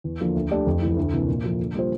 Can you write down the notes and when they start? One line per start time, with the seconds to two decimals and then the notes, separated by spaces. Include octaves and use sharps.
0.04 E2
0.20 D3 F3 A#3
0.35 D2
0.51 D3 A3 D4 G4
0.66 F2
0.81 E3 A3 E4
0.97 D2
1.13 C3 E3 A#3
1.28 A#2
1.44 F3 A#3
1.59 D3
1.75 G3 A#3 F4 C5